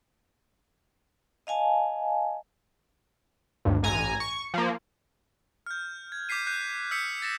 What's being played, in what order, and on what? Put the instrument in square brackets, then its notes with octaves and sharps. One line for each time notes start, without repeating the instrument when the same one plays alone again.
[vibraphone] D#5 F5 G#5 A5
[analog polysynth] G#1 [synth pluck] D2 G2
[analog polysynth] A1 G#5 A#5
C#6
F3 A#3
[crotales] F6 G6
G#6
D6 G6 B6 C7 D#7
F#6 G6 C7 D#7
D#6 E6 F#6 G6 B6 C#7
A6 A#6 E7